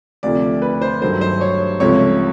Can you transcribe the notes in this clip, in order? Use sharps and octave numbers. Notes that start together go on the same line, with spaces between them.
D2 C3 F3 A3 D5
B4
C5
G2 D#3 F#3 A3 C5
C5
C#5
C#2 C3 F3 A3 C#5